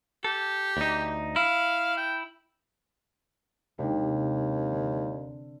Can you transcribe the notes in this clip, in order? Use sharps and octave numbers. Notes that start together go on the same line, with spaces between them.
G4 A4
D2 D#4
E4 F5
G5
D#2 C3 G#3 D4 D#4
D3